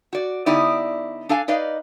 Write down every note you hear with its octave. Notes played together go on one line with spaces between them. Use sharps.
F#4 D5
D3 B3 D#4 E4 G4 D5
D4 A4 F5 G#5
D#4 B4 D5 D#5 F5